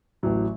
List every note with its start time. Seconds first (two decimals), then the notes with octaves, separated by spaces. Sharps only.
0.23 A1 A2 F#3